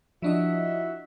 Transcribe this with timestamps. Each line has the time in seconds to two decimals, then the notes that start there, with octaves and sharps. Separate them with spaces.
0.22 F3 D4 E4 F#4 D#5 E5